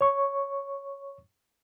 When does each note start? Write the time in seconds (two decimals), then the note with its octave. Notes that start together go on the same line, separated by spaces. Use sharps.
0.01 C#5 C#6